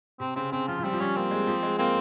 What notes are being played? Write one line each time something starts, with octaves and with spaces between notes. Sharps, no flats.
C3 C4
C#3 C4
C#3 C4
F3 F4
F3
G3 C4
F3
G3 C#4
A#3 C4
G#3
F3
G#3
A#3 C4